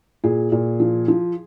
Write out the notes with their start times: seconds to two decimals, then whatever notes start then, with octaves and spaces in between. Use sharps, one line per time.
0.24 A#2 G#4
0.52 A#2
0.80 F3
1.08 F3